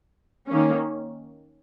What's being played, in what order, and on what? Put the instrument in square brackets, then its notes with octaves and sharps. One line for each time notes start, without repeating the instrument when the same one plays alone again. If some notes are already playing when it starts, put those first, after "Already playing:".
[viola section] D#3 A#3 C#4